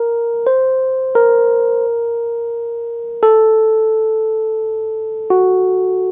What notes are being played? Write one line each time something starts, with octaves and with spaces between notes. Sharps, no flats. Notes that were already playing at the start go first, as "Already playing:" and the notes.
Already playing: A#4
C5
A#4
A4
F#4